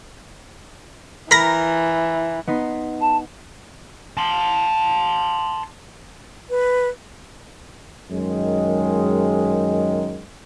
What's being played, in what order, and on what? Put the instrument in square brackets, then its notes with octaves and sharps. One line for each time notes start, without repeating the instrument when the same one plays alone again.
[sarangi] E3 [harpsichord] A#4 [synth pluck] A#5 B5 A#6
[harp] B3 D#4 C6
[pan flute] A5
[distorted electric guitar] A5 C6
[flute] B4
[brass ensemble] F#2 D#3 G#3